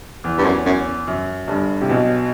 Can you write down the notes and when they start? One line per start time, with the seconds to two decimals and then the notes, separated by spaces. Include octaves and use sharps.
0.24 E2
0.38 G2
0.44 F#2
0.66 F#2
1.07 F#2
1.48 G1 G2
1.81 C3
1.89 B1 B2